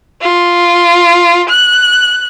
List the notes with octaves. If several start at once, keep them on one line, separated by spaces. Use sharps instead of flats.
F4
F#6